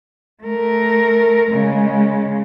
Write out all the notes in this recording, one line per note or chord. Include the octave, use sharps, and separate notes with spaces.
A3 A#4
C#3 G#3